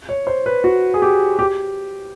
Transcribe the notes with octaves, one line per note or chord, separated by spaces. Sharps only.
C#5
C5
B4
F#4
G#4
G4
G4